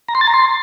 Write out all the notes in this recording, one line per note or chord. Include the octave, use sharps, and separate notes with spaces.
A#5
C6
A6
A#5
C6